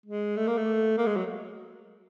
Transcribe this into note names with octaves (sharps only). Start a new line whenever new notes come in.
G#3
A3
A#3
A3
A#3
G#3
F#3